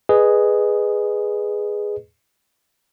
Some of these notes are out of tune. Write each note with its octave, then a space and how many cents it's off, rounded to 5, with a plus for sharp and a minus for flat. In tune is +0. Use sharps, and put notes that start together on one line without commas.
G#4 +0 B4 +0 D#5 -20